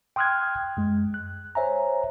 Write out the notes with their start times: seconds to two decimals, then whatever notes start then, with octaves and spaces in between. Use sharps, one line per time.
0.16 G5 C6 D#6 F6 F#6 G#6
0.77 F#2 G#3
1.14 F#6
1.55 C5 C#5 E5 G#5 A#5